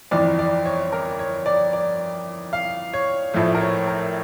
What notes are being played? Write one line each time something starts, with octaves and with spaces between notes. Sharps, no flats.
G1 F2 E3 D5
D5
C#5
A#4
C#5
D5
D5
F5
C#5
A#1 A2 F3 A3
A#4
C#5
A#4